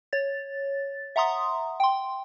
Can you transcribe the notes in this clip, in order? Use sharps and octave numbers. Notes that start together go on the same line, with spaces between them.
C#5 A6
E5 F#5 A#5 C6 D#6
G5 C6